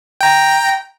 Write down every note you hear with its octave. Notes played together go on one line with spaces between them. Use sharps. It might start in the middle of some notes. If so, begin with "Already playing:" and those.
G5 A#5